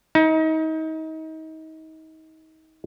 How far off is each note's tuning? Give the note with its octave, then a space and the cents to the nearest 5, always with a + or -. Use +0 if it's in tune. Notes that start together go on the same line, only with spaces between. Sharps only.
D#4 +30